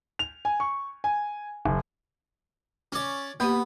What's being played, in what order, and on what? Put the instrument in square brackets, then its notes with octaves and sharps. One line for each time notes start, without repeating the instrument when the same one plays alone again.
[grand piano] F7
G#5
C#6
G#5
F#1
[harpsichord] C#4 D5
[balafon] A#3 G4 [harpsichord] B3